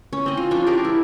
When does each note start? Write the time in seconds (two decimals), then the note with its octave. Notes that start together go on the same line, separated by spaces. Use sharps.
0.13 C#4
0.26 C4 D#5
0.37 F4
0.51 F3 C#4 D4 F4
0.66 G4 G#4 A#4 D5
0.85 E4 D5